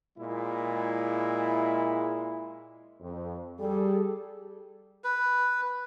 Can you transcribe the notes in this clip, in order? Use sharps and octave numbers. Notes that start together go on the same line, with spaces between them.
A#2 G#3 E4
F2
G3 G#4 A4
B4